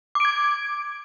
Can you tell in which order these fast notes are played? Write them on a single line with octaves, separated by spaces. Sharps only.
D6 D7 G#6